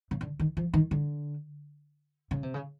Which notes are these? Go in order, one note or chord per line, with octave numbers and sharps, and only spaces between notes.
C#3
D3
D#3
F3
D#3
D3
C#3
C3
C#3